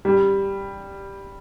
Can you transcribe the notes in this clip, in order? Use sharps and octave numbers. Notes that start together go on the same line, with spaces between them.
G3